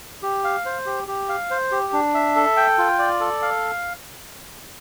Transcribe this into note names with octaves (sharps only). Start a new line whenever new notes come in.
G4
F5
C5
G4
G4
F5
C5
G4
D4
E5
A4
G5
F4
D5
A4
F5